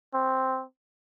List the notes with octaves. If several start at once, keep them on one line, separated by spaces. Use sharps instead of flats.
C4